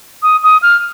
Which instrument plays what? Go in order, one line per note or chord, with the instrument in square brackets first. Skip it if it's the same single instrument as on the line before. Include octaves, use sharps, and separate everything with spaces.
[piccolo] D#6
D#6
F6